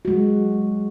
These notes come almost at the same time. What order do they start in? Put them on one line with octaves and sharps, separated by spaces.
F#4 G#3 F#3